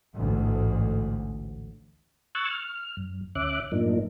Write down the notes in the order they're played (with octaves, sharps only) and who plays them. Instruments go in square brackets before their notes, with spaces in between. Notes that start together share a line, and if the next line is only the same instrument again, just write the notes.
[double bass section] A1 D2 G#2
[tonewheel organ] C#6 E6 F#6 G#6 A6
F6
F#2
D2 C#4 E5 D6 F#6
F#2 A2 F3 A#3 D4 D#4